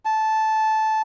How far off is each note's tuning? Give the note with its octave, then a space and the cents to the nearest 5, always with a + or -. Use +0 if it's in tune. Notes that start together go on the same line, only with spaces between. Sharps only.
A5 -10